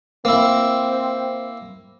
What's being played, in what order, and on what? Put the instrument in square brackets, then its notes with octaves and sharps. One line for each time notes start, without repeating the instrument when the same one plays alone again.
[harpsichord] A#3 E4 [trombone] C4